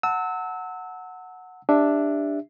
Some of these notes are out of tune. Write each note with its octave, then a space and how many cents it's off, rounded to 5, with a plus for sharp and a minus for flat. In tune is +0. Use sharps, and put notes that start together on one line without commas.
F#5 -5 A5 +35 E6 -25
D4 +0 G4 +20 E5 +0